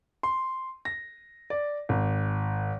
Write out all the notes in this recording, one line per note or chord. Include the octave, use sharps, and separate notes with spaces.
C6
A#6
D5
G#1